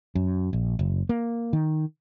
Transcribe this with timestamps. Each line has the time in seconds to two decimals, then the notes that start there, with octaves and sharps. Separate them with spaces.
0.15 F#2
0.53 A#1
0.79 F#1
1.09 A#3
1.53 D#3